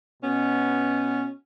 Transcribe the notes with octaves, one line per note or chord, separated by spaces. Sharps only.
B2 B3 C#4